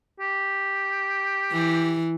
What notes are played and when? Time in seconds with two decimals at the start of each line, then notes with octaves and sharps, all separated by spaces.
0.20 G4
1.52 E3